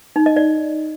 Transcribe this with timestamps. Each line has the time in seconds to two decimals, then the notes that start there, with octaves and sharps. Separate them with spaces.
0.16 D#4
0.26 D#5
0.36 D5